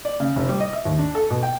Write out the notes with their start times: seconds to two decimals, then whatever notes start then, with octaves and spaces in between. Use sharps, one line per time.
0.05 D5
0.20 C#3
0.36 F1
0.49 G3
0.60 D#5
0.73 E5
0.85 D#2
0.99 D4
1.15 A4
1.30 B2
1.43 G5